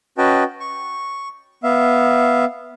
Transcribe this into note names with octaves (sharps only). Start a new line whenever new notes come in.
C#4 F#4 B4 D#5 G5 A5
C#6
B3 E5 F5